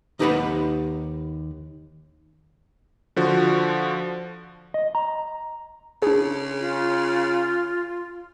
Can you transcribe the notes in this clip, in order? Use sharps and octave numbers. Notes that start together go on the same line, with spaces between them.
D#2 D#4 G4 B4 F#5 B5
D3 F3 F#4
D#5
A#5
C#3 D4 G#4
F4